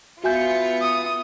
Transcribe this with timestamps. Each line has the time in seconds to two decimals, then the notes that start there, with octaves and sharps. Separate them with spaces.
0.24 B3 F4 F#4 E5 G#5 G6 C#7
0.81 D#6